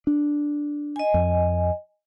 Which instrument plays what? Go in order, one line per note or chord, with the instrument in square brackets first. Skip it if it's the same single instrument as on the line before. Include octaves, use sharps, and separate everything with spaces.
[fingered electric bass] D4
[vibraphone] D#5 G#5
[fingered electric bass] F2